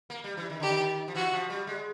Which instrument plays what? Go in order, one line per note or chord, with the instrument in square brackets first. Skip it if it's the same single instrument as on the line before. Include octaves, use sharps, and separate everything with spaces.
[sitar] A#3
G3
E3
D#3
[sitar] D3 [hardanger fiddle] G4
[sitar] D#3
F3
[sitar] E3 [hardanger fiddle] F#4
[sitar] F3
G3
G#3